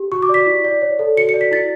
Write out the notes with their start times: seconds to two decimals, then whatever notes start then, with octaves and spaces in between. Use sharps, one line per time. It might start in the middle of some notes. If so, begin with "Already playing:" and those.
Already playing: G4
0.12 F#4 C#6
0.23 D6
0.29 D5 B6
0.46 E4
0.65 D5
0.82 C#5
0.99 A4
1.17 F#4 C#7
1.29 C#7
1.34 D5
1.41 B6
1.52 E4 A6